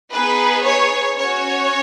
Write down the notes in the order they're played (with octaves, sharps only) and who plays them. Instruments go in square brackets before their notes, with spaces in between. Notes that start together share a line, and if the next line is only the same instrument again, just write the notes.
[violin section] B3 D#4 G#4 B4
C#5
C#4 F#4 C#5